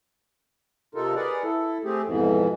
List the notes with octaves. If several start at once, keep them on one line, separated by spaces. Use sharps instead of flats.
C3 D#4 F4 A4 A#4
G#4 A#4 B4 D5 F#5
E4 A4
A3 C4 G4 G#4
F2 G#2 B2 E3